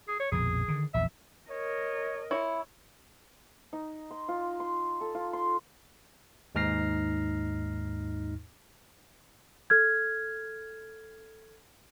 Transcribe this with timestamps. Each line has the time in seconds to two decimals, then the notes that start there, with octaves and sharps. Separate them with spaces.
0.08 G#4
0.20 C#5
0.32 A#1 F2 B2 G#4
0.68 D3 D#3
0.94 A#1 E2 E5
1.50 A#4 C#5 D#5
2.31 E4 C#5
3.73 D#4
4.11 C6
4.28 F4
4.60 C6
5.01 A4
5.15 F4
5.33 C6
6.55 D#2 G#2 D#4 F6 A#6 C7
9.70 A4 F6 G#6